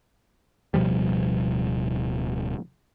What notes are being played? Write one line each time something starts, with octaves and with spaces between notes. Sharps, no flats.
D1 B2 F3 G3